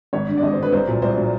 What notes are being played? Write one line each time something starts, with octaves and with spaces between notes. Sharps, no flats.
G#1 C#5
G2 D3
D5
G#1 D#5
C5
G2 D3 B4
C2 C5
A#2 F#3
C2 C5
A#2 F#3